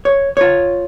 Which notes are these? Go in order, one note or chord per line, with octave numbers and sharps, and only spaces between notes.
C#5
F4 C#5